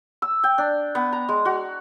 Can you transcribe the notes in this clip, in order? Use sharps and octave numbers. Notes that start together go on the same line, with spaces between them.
E6
G5
D4
B3
A#5
G#3
F#4